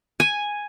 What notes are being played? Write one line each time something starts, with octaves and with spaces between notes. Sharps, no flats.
G#5